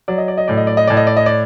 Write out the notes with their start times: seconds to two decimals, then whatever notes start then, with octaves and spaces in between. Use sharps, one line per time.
0.08 F#3 D5
0.18 D#5
0.28 D5
0.38 D#5
0.48 A2 D5
0.57 D#5
0.67 D5
0.77 D#5
0.87 A2 D5
0.97 D#5
1.07 D5
1.17 D#5
1.26 D5